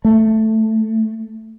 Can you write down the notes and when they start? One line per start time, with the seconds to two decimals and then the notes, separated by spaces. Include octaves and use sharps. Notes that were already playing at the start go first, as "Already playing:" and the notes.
0.05 A3